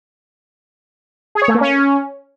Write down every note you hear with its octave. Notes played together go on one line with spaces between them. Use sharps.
G#4
C#5
A3
A#3
C#4